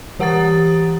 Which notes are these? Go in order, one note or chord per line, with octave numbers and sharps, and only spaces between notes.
E3 G4 F#5 A#5 D#6 A6